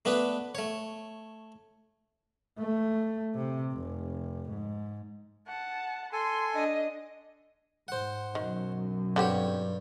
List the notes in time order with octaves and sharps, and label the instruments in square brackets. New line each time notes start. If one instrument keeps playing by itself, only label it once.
[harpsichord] A3 B3 D4 B4
A3 C#5
[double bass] A3
C3
F1
G#2
[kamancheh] F#5 A5
[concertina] A4 G#5 [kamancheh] C6
[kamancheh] D4 D#5
[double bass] G#2 [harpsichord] C5 F#5
[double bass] B1 F#2 [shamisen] D#3
[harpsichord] G2 C#5 [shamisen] D3 C4 G4